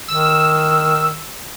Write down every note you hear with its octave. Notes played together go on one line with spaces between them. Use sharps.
D#3 E6